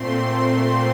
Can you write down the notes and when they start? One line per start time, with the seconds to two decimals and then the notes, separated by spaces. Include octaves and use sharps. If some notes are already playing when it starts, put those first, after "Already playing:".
Already playing: A#2 A3 C4 C6